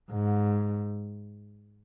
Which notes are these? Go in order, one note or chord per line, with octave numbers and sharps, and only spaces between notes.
G#2